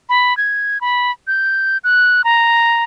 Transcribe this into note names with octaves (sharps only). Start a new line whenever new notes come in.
B5
G#6
B5
G6
F#6
A#5